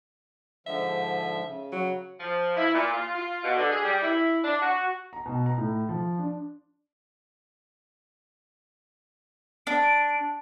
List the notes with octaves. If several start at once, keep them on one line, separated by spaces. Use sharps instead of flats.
G#2 D3 F3 E5
C#3
F#3
F3
E4
A#2
F4
F4
B2
D3
G#4
G3
E4
D4
F#4
A#5
B2
A#5
A2
F3
D4
D4 D7